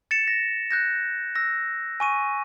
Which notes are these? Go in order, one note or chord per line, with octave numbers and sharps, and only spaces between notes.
A6 C#7 E7
A#6
F#6 G6 A#6
E6 A#6
G#5 C#6 D#7